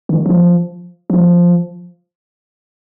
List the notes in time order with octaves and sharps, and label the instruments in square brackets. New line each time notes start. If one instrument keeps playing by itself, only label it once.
[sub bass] D#3
F3
F3